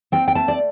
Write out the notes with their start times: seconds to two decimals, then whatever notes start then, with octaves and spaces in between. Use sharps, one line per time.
0.12 C4 G5
0.28 G5
0.35 A3 A5
0.48 D5